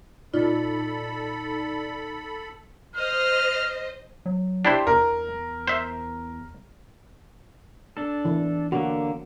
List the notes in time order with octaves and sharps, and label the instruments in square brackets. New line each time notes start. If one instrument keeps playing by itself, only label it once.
[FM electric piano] A#2 D#4 D5 [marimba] F4 [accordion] A4 B5
[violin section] C5 D#5 [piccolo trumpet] F6
[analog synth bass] F#3
[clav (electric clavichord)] D4 E4 C5 [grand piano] G4 C6
[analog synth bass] E2 [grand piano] A#4
[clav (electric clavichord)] C5 E5
[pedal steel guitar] D4 A4
[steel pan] E3
[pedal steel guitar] D3 A#3 [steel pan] F#4